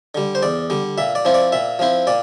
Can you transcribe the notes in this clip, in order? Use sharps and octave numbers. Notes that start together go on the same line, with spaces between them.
D3 G3
C5
E2 D5
D3 G3
A#2 E5
D5
F3 C4 E4
D5
A#2 E5
F3 C4 E4
A#2 D5